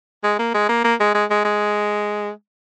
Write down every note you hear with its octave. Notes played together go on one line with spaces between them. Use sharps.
G#3
A#3
G#3
A#3
A#3
G#3
G#3
G#3
G#3